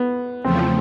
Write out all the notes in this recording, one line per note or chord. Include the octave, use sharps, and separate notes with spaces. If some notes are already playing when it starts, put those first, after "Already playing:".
Already playing: B3
E2 C#3 F3 A3 C4